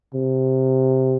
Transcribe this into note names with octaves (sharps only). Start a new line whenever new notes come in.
C3